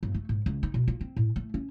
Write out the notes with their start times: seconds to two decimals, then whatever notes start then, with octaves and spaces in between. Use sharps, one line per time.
0.03 G1
0.14 A3
0.29 G#2
0.46 C#2
0.63 D#4
0.74 B2
0.88 F4
1.01 C4
1.16 A2
1.36 A3
1.54 C#4